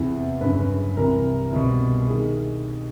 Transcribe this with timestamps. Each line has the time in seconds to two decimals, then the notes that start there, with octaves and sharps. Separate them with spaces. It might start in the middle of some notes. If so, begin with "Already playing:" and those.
Already playing: E2 C3 E3
0.41 G1 F#2 C#3 B4
0.97 C2 C3 E3 A#4
1.53 C2 B2
2.07 D#3 G#4